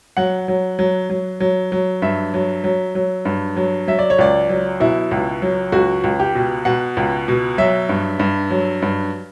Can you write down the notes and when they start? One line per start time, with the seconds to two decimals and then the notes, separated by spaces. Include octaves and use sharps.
0.17 F#3 F#5
0.48 F#3
0.79 F#3
1.10 F#3
1.40 F#3
1.72 F#3
2.02 G2 E5
2.34 F#3
2.64 F#3
2.95 F#3
3.25 G2
3.56 F#3
3.87 F#3 E5
3.99 D5
4.10 C#5
4.18 C#2 D5
4.49 F#3
4.80 B2 E4
5.11 C#2
5.42 F#3
5.72 C#2 F#4
6.04 C#2
6.20 G4
6.35 B2
6.65 B2 F#5
6.97 C#2
7.28 B2
7.58 F#3 E5
7.89 G2
8.19 G2
8.51 F#3
8.82 G2